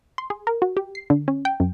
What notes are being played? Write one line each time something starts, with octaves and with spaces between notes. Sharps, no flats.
C6
G#4
A#4
F#4
G4
C7
D3
C#4
G5
F#2